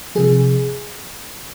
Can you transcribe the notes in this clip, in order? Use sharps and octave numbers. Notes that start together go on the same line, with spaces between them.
C3 F3 G#4